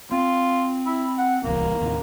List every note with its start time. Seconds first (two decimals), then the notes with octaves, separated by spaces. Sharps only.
0.11 C4 F4
0.86 E4
1.18 F#5
1.44 D1 C2 E3 A#3
1.80 D#2 A2 C3